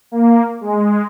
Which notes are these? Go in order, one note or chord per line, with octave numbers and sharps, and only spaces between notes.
A#3
G#3